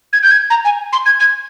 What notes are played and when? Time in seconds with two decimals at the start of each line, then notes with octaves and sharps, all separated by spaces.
0.13 G#6
0.23 G6
0.31 G#6
0.50 A#5
0.65 G#5
0.93 C6
1.06 G#6
1.20 G#6